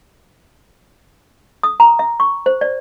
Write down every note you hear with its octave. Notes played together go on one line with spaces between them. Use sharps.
D#6
A#5
E5
C#6
C5
D5